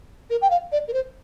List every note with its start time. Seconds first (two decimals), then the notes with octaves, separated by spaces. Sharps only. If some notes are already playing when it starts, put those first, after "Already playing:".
0.30 A#4
0.42 G5
0.51 F5
0.72 D5
0.88 A#4
0.93 C5